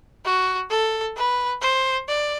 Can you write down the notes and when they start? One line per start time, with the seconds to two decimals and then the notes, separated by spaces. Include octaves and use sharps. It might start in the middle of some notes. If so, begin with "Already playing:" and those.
0.25 F#4
0.70 A4
1.16 B4
1.62 C5
2.08 D5